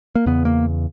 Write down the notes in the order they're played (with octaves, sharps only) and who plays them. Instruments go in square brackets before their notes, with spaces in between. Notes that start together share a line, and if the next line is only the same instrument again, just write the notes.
[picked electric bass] A#3
E2 C#3 B3
A#3